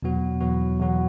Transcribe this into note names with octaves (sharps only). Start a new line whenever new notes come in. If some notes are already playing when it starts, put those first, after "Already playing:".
E2 B2 F#3 B3 F#4
E2 B2 F#3 B3 F#4
E2 B2 F#3 B3 F#4